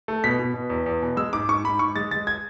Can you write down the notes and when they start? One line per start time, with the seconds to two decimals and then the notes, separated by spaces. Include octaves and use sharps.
0.08 A3
0.24 B2 B6
0.39 B2
0.54 B2
0.70 E2
0.86 E2
1.02 B2
1.17 G#3 E6
1.33 G#2 D6
1.49 G#2 C#6
1.64 G#2 B5
1.79 G#2 C#6
1.96 G#3 A6
2.11 G#3 A6
2.27 G#6